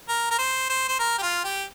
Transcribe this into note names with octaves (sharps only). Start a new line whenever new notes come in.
A#4
A#4
C5
C5
C5
A#4
G4
F4
G4